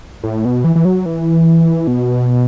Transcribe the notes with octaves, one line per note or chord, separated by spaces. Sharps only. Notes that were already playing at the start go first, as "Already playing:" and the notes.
A2
B2
E3
E3
F#3
E3
B2